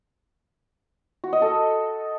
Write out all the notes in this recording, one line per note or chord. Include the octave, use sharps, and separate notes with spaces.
F#4
D#5
A4